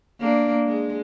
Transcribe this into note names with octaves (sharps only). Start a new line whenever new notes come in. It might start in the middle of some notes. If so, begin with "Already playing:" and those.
A#3 D4
G#3